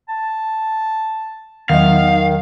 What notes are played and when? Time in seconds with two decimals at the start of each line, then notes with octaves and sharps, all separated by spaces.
0.08 A5
1.69 E2 D#3 F#3 B3 D#5 F5